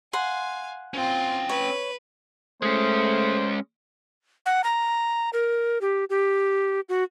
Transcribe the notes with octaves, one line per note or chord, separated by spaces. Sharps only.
F5 F#5 G#5 C6
C4 C#4 F4 G5
B4 C#5
G#3 A3 C#4 C5
F#5
A#5
A#4
G4
G4
F#4